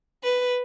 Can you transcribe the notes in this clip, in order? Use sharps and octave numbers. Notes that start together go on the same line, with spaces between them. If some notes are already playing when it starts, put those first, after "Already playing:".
B4